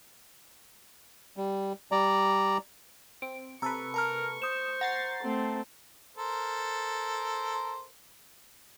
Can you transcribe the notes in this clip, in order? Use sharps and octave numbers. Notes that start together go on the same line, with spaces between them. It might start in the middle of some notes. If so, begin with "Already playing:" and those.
G3
G3 D5 A#5
C4 D7
C3 A4 B4 A#5 C#6 E6
A#4 A5 A#5 F6
C5 D#6 E7
F#5 A#5 A6 C7
A3 C4
A4 A#4 C5